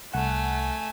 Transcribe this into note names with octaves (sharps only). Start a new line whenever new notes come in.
C2 A3 F#5 G#5